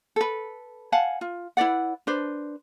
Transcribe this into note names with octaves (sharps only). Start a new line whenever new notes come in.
A4 B4
F5 F#5 G#5 A5
F4
E4 B4 D5 F#5
D4 B4 C5